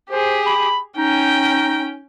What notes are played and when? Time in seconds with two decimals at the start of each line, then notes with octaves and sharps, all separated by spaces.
0.11 G4 G#4 C5
0.47 B5
0.98 C#4 D#4 G5